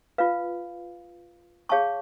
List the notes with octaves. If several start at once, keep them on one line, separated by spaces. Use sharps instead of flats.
F4 B4 F5
G#4 C#5 F5 A5 C#6